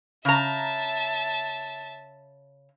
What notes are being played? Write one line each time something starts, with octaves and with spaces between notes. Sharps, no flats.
C#3 E5 A5 A#5